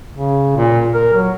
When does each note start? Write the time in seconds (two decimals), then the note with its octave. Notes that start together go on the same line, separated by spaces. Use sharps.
0.15 C#3
0.56 A#2
0.94 A#4
1.14 F#3